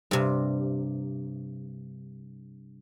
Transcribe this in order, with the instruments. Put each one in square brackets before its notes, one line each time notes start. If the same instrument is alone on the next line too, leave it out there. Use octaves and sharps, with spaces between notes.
[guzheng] G2 C3